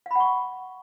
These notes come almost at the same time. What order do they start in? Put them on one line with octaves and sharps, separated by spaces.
F5 B5 F#5 C#6